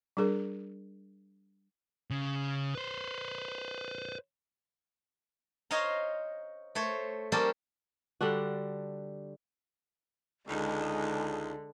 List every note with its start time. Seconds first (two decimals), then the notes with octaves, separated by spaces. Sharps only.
0.17 G3 D4 G#4 A#4
2.10 C#3
2.75 B4 C5
5.71 C5 C#5 D#5 F5 A#5
6.75 A3 C5 C#5
7.32 G3 A#3 C#4 G4 A4 C5
8.21 D3 G3 D4 F#4
10.49 C#2 D3 G#3 D#4